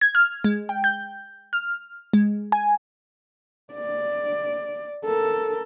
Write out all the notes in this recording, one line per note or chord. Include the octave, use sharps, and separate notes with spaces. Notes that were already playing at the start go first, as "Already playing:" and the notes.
G#6
F6
G#3
G5
G6
F6
G#3
G#5
D5
A4 A#4